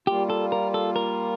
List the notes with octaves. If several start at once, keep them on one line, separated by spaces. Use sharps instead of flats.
G3 A#3 F4 G4
A4
A#4
A4
A#4